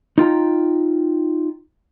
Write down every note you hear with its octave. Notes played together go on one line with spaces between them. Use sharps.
D#4 F4 G5 A#5